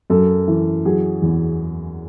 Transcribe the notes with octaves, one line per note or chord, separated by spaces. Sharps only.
F#2 A4
E3
F#3 G#4
E2